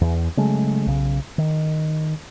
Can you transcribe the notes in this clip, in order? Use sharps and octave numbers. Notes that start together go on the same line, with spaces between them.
E2
C#3 F#3 G#3 A3
B1 C#3
D#3